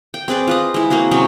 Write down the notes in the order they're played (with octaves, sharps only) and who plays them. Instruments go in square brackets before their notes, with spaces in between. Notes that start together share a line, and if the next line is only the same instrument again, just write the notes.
[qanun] G5
C4 G#4 B4 D5
F4 B4 D#5
G#3 E4
A#3 C4 F#4 G#4
C3 F#3 G#3 C#4